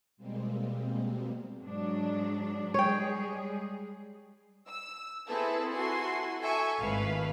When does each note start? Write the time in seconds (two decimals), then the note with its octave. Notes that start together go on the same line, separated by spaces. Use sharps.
0.17 B2 G3 G#3 A#3 C4
1.62 G#2 F#3 D4
2.74 G3 G#3 G#4 C#5 G5
4.69 E6
5.28 C4 E4 G#4 A4 B4 A5
5.71 E4 F#4 A4 G#5 C6
6.42 A4 E5 G#5 C#6
6.81 G#1 A2 D#3 B4 F5